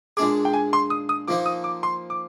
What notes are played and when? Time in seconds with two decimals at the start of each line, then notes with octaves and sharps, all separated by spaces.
0.17 A#2 G#3 D4 G#4 D6
0.45 G5
0.53 G#5
0.73 C6
0.90 D#6
1.09 D#6
1.27 A#2 F3 A#3 D#4 D6
1.46 D#6
1.64 D6
1.83 C6
2.10 D6